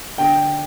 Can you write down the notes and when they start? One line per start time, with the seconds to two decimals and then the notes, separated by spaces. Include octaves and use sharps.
0.18 D3 G5